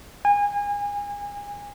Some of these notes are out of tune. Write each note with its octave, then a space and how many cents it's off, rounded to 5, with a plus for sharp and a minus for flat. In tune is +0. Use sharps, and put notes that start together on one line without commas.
G#5 -30